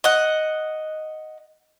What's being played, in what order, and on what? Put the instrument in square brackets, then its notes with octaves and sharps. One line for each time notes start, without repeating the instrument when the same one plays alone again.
[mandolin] D#5 F#5